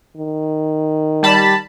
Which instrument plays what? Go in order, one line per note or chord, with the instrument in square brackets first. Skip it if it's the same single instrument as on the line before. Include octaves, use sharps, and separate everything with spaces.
[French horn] D#3
[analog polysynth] G3 A5 B5